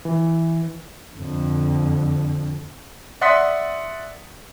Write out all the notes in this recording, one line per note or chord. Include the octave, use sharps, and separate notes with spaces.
E3
F2 D3
D5 E5 F#5 C6 D#6 B6